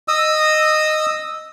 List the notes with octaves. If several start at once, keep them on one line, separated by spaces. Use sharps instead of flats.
D#5 D#6 E6